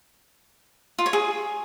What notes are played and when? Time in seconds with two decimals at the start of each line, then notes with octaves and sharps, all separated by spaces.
0.99 F4
1.06 C#5
1.13 G#4